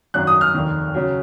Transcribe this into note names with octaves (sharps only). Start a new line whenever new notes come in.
G#1 F#2 D#3 F#3 F#6
D#6
F6
F1 D#2 D#3
C#3 F#3